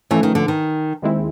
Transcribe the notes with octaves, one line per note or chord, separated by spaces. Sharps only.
E3 F3 A3 C#4
D#3
D3
D#3
D#2 D#3 G#3 C4 E4